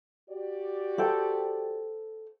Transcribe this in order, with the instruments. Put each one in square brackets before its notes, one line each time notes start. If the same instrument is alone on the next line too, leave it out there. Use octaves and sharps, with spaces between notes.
[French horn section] F#4 G4 D5
[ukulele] A4 C5 G5